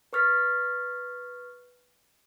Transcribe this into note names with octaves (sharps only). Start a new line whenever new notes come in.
B4 C#6 F6 A6 B6